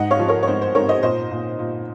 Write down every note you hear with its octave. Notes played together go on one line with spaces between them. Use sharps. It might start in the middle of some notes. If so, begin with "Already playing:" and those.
Already playing: G#2 D#5 F#5
C#5 F5
F3
A#4 C#5
C#5
G#2 C5
C5
G#2 A#4 C#5
C5 D#5
A#2 C5 D#5
A#2
A#2